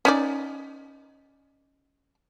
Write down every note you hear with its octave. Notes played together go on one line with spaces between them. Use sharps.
C#4 D#4 D5